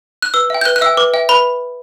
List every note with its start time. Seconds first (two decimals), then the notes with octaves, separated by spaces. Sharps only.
0.22 F#6
0.34 B4 E6
0.50 E5 G5
0.61 G6
0.65 B4 F#6
0.76 F#6
0.81 E5 G5 E6
0.97 B4 D6
1.14 E5 G5
1.29 B4 B5